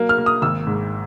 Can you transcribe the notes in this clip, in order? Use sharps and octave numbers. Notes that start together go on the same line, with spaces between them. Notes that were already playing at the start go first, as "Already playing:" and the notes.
Already playing: F#3 A#3
F6
A#3
D#6
G#1 E6
G#2